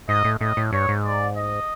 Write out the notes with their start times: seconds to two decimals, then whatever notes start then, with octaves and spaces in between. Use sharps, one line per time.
0.09 G#2 D#5
0.25 A2
0.41 A2 D#5
0.57 A2
0.73 G2 C#5
0.89 G#2
1.05 D5
1.37 D#5